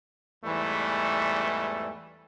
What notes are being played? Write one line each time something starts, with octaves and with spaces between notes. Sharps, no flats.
E2 G#2 E3 G3 A3